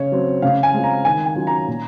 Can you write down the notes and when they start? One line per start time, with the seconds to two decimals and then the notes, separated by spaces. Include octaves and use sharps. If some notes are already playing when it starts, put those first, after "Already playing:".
Already playing: C#3 C#5
0.12 F#3 C4
0.42 C#3 F5
0.63 G#5
0.74 G#3 C4 F4
0.84 A#5
1.05 D#3 G#5
1.26 G#5
1.36 F#3 C#4 F4
1.47 A#5
1.67 A#2